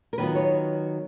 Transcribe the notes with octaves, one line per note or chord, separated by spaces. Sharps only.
A#4
D#3 F#3 B3 F4 B4
C#5